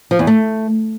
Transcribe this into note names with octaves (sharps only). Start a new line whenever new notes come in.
F3
E2
A3